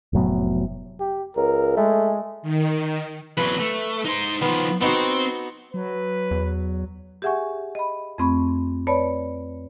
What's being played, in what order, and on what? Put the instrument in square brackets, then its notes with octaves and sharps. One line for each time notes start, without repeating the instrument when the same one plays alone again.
[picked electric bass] F1 A2 F#3 B3
[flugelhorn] G4
[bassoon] C#2 [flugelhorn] A#4
[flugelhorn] G#3 [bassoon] A3
[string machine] D#3
[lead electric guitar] E2 F#3 [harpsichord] B4
[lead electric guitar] A3
D#4 C5
[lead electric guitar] D#3 F3 [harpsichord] B3
[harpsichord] B3 D#4 F#4 [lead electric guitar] C4
[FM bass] F#3 [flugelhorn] B4
[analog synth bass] E2
[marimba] G4 G#4 E5 F#5 G#5 C#6
D#5 B5
F2 A3 C4 B5 C#6
B4 C#5 D5 A5 B5